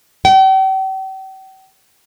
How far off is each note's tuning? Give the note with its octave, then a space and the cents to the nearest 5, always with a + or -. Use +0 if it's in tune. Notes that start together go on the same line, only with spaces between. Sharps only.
G5 -40